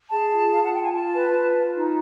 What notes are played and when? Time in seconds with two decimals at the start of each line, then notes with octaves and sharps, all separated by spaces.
0.11 G#4 A5
0.31 F4
0.52 F4 F5
0.63 F#5
0.71 F4 G5
0.82 G#5
0.93 F4 A5
1.13 B4
1.33 F4
1.54 F4
1.75 D#4